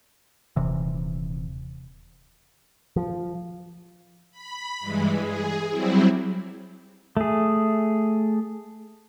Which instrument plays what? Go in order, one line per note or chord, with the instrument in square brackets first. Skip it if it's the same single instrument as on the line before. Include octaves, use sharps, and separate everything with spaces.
[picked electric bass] D#1 C3 E3
F3
[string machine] B5
G2 E3 G#3
G#4
F#3 G3 C4 E4
[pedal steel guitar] A3 G#4